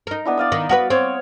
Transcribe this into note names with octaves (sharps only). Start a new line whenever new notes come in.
D#4 A#4
B3 D4 E4
D5 F5 D#6
D#3
F#4 A#4 B4
C4 C#5